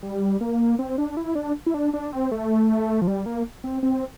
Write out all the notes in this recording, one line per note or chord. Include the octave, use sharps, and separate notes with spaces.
G3
A#3
C4
D4
E4
D4
E4
D4
D4
C4
A3
F3
G3
A#3
C4
C4